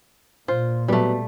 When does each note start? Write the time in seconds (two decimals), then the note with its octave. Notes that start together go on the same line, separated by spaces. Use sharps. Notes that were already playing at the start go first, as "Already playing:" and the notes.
0.48 A#2 F4 C5
0.88 B2 E3 F#3 G3 A3